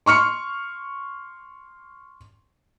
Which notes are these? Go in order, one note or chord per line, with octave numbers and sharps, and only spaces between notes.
C6 C#6 F6 C#7